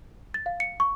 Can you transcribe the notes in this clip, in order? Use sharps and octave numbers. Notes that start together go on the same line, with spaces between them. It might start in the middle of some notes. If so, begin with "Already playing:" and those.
A6
F5
C#7
C#6